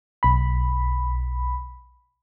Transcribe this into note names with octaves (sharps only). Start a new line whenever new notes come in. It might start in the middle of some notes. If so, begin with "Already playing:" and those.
B1 B5